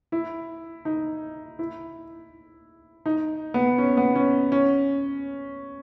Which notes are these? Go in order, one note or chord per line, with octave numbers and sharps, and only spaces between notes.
E4
D#4
E4
D#4
B3
C#4
B3
C#4
C#4